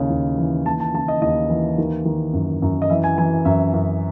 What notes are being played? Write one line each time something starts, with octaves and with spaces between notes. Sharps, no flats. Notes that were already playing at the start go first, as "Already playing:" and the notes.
Already playing: D#2 C#3 C#5
D#2
E3
D#2 A5
A5
C#3 A5
D#5
D#2 D#5
E3
D#3
D#3
F#2
F#2
D#5
E3 E5
G#5
E3 G#5
F#2 E5
F#2